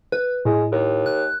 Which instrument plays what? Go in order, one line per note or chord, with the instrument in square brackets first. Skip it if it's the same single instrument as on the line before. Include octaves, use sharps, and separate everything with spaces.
[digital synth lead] B4
[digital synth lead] A2 [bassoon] G#3
[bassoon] D#2
[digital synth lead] F#6